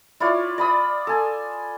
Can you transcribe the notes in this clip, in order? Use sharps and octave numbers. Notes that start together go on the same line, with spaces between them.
E4 F4 C#5 D5
D5 B5 D#6
A4 G#5